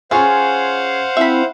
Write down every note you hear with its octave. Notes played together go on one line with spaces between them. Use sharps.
C#4 F4 G#4 C5 C#5 F5 F#5
C4 E4 E5 B5